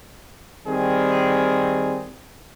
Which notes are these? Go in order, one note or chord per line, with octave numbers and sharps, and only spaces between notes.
D#3 G3 C4 G#4